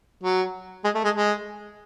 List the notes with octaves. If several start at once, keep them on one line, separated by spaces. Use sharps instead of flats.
F#3
G#3
A3
G#3
G#3